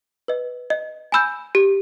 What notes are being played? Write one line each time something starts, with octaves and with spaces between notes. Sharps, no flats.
B4 D#5
D#5
G#5 B5 E6 G6
G4